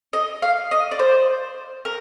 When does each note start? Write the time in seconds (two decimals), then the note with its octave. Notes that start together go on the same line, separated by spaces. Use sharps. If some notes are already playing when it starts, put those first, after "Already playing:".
0.13 D#5
0.42 F5
0.71 D#5
0.91 D5
0.99 C5
1.85 A#4